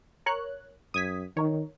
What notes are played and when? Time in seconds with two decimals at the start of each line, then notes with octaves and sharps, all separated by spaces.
0.26 A#4 C#5 F#6
0.94 F#2 D#6 G#6 B6
1.37 D#3 D#4 A#4 C#5